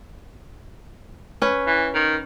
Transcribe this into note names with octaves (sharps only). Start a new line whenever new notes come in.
C#4 B4
E3
D#3